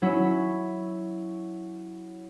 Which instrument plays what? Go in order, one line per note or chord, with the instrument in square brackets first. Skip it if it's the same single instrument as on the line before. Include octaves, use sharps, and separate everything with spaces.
[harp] F#3 C#4 E4